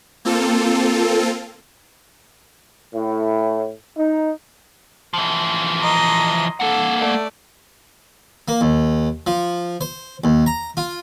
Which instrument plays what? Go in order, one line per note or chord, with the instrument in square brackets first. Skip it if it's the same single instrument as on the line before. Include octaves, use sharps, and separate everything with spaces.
[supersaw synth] A#3 C4 F4 A4
[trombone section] A2
D#4
[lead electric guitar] E3 F3
[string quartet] D#5 A#5 C6
[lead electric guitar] A#3 F#5 [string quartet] A4
[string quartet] A3 D5
[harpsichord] A#3
D#2
F3
C5
D#2
A#5
F4